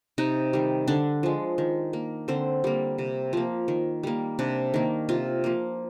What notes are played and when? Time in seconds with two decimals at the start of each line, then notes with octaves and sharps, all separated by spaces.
0.18 C3 D#4
0.53 D#3 G3
0.88 D3 D4
1.23 F3 G#3
1.58 D#3
1.93 A#3
2.28 D3 C4
2.64 G3 A#3
2.98 C3
3.33 F3 A#3
3.68 D#3
4.03 G3 A#3
4.39 C3 D4
4.74 D#3 A#3
5.09 C3 F4
5.44 F3 A#3